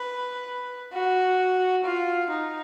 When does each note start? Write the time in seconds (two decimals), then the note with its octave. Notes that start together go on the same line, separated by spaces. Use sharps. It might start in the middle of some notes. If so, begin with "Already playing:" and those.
Already playing: B4
0.93 F#4
1.84 F4
2.30 D#4